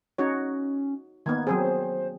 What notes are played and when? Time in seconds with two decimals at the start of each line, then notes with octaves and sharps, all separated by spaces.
0.18 C#4 D#4 F#4 C#5
1.26 D#3 A#3 B3 G#6
1.47 F#3 C4 G#4 C5